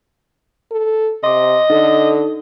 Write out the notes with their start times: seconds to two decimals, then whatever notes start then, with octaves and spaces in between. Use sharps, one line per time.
0.71 A4
1.24 C3 D#5 C6 D6
1.70 D3 D#4 A4